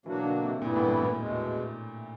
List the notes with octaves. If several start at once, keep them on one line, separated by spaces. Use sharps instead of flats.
B2 E3 F#3 A#3 D4 F#4
D3
C3
G2 A#2 E3 G3 B3 E4
A2
A2
A2
E2 B2 G#3